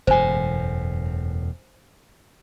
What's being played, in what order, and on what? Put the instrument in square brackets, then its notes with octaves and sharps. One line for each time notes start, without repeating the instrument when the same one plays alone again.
[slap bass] E1 F#2 A2 [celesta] C5 G#5